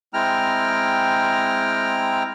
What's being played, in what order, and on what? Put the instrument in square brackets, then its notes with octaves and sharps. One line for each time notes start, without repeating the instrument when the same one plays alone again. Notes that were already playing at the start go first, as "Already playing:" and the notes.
[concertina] G#3 C4 E4 G5 A#5 F6